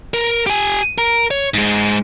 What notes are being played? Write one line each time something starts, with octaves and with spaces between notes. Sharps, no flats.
A#4
G4 G#5
A#4
C#5
G#2 G#3